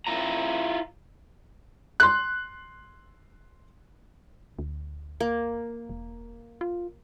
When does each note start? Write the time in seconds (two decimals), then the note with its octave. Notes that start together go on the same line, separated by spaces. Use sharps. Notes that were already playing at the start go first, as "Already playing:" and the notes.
0.07 E4 F4 A#5
2.00 C6 F#6
4.59 D2
5.20 A#3
5.89 E1
6.61 F4